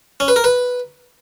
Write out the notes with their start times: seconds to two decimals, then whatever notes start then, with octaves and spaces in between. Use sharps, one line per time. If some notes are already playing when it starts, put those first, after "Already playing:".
0.20 C#4
0.28 B4
0.36 A#4
0.44 B4